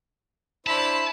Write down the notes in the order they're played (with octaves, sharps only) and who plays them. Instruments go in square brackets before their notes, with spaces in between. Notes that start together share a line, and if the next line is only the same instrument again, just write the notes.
[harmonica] D4 E4 C5 [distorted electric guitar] A5 [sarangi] B5